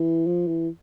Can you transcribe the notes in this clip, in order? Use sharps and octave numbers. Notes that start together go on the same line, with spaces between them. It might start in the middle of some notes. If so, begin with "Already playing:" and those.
Already playing: E3
F3
E3